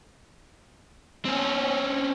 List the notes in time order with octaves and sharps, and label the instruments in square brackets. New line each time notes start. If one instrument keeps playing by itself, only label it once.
[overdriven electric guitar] C4 C#4